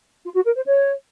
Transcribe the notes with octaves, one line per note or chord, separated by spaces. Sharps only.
F4
F#4
A#4
C5
C#5